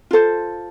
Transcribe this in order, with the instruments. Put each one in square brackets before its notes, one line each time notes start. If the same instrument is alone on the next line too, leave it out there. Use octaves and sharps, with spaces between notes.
[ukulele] F4 A4 C5